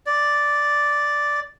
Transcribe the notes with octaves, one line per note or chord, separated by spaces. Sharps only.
D5